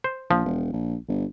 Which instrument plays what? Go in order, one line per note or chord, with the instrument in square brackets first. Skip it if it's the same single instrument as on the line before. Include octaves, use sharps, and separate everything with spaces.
[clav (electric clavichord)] C5
[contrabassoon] A#1 [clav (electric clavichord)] F3
[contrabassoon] E1
A#1
G1